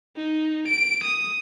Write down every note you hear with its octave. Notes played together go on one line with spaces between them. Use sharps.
D#4
D7
D#6